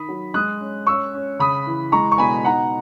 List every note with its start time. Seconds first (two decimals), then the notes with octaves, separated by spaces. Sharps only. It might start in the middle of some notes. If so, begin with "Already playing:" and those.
Already playing: D#3 B5 D#6
0.09 F#3
0.34 G#3 D#6 F#6
0.60 C#4
0.87 C#4 C#6 E6
1.14 C#4
1.39 C#3 B5 D#6
1.67 E3
1.92 G#3 A#5 C#6
2.12 C#6
2.18 B2 G#5 B5
2.45 D#4 F#5 A#5